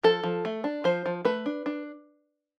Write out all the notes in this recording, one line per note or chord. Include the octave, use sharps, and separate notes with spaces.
F3 A4
F3
A3
D4
F3 C5
F3
A3 B4
D4
D4